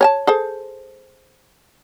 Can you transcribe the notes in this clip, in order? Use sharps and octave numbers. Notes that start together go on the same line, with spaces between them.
C#5 G#5 A5
G#4 A4 C5